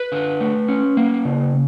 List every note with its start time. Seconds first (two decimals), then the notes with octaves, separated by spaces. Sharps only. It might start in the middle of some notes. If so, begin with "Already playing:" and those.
Already playing: B4
0.12 D3
0.41 A3
0.69 C#4
0.97 A#3
1.25 C#3